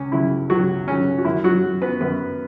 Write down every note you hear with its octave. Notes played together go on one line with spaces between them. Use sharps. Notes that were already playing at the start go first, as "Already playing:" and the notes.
Already playing: C#2 C#4
C#3 F#3 E4
C#2 F#3 F#4
C#3 F#3 C#4
F#4
F#2 E4
F#3 F#4
F#3
B3 B4
F#2 B3 B4